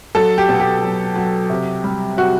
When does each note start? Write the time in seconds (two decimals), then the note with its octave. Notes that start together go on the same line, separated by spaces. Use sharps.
0.15 F#3 A4
0.38 G4
0.49 B2
0.60 G4
0.83 F#3
1.16 F#3
1.50 C3
1.84 G3
2.17 C3 F#4